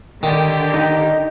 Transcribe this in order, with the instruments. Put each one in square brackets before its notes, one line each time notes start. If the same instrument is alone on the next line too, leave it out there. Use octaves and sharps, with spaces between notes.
[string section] D3 G4 [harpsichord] D#3
[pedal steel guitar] D#4